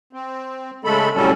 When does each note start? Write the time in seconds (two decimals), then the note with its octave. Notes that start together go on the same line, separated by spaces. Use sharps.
0.13 C4
0.84 C#3 G#3 A3 A4 B5
1.15 A2 C3 F#3 G3 C#4 A4